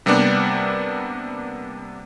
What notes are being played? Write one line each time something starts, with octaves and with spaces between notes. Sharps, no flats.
C3 G3 A#3 B3 D4